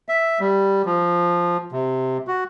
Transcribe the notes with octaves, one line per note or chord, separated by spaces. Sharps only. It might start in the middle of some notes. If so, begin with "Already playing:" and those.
E5
G3
F3
C3
F#4